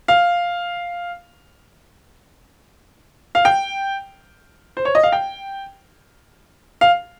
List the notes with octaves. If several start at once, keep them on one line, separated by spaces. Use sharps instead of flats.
F5
F5
G5
C5
C#5
D#5
F5
G5
F5